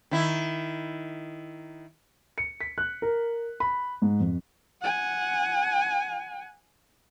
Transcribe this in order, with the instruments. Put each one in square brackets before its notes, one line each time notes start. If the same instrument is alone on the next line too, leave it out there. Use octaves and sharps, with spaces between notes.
[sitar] D#3 E4
[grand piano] C#7
B6
F#6
A#4
B5
G#2
F2
[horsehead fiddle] F#5 G#5